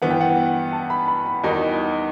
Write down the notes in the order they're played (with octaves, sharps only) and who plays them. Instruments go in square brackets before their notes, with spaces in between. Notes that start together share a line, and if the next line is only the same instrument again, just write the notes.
[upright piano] G2 E3 B3 [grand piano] F#5
[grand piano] G5
F#5
A5
B5
B5
B5
[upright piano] E2 D#3 G3 D#4 F#4